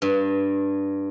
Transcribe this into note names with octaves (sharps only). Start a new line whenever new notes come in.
G2